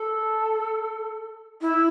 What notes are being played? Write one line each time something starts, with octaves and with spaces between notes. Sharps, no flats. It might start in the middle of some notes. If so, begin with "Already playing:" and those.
Already playing: A4
E4